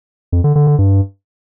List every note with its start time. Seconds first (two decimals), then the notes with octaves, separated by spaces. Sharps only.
0.32 F2
0.44 D3
0.56 D3
0.67 D3
0.79 G2